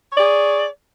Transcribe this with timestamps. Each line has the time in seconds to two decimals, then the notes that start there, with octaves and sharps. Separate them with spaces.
0.12 C#5
0.16 D5
0.19 G#4